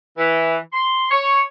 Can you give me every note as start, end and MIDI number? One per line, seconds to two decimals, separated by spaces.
0.18 0.56 52
0.73 1.06 84
1.11 1.42 73